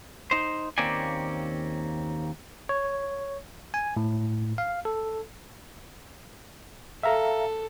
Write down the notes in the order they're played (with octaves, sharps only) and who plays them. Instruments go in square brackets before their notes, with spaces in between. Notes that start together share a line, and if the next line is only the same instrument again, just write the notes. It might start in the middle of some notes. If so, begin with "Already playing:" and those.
[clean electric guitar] D#4 C5
D#2 A#3 C4 C#4 D5 G#5
[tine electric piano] C#5
G#5
A2
F5
A4
[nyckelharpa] A4 [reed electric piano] E5 F5 A#5